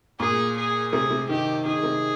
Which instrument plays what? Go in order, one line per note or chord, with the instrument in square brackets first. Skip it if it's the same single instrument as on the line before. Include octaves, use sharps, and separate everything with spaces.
[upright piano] A#2 [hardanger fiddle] G#4
[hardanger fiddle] G#4
[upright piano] C3 [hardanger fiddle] G#4
[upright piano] C3
[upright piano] D#3 [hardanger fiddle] G4
[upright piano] D#3 [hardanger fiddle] G#4
[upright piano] C3